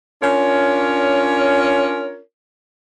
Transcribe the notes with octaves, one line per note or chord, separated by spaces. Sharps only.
C#4 D4 F4 A#4 C#5